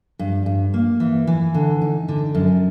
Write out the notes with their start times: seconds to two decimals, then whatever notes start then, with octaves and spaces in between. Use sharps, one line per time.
0.19 G2
0.46 G2
0.74 A#3
1.00 E3
1.27 E3
1.54 D3
1.82 D#4
2.09 D3
2.35 F#2